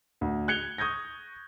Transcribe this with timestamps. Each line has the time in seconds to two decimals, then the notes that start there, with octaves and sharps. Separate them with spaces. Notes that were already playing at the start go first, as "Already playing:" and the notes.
0.21 D2
0.48 F#6 G#6 C#7 F7 G7
0.78 C#6 D#6 G6 G#6 A#6